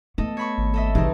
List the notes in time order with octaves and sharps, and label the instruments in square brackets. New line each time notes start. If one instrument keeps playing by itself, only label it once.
[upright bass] A3 B3 [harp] A4 D#5
[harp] C#5 B5 C#6
[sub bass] G#1
[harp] A4 D#5 E5
[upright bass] C2 C#3 [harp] E3 C4 D#4